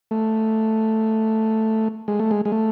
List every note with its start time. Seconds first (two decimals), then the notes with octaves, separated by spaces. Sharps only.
0.11 A3
2.08 G#3
2.20 A3
2.31 G#3
2.45 G#3
2.52 A3